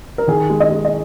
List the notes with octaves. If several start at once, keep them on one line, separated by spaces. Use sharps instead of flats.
A#4
D#3 G#4
G#3
D#5
G#3
D#5